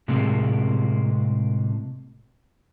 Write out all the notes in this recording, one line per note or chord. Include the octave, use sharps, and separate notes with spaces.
A2 C3 G#3 A#3 C4